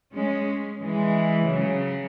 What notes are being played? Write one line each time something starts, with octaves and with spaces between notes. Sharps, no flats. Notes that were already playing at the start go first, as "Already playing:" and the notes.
G#3 C#4
E3 G#3
C#3 F#3